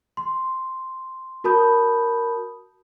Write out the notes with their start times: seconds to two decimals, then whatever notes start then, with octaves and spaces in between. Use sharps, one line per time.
0.17 C6
1.44 F#4 A#4 A5 B5 D#6 G6